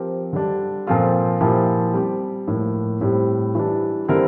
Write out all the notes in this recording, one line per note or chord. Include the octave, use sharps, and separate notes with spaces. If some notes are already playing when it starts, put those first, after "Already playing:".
Already playing: F3 C4 G4 A#4
D3 G3 D4
A#2 F3 C4 F4 A4
A#2 F3 A#3 E4 G4
G3 C4 G4
A2 F3 A#3
A2 G3 C4 E4
E3 G3 D4
D3 G3 C4 E4 A#4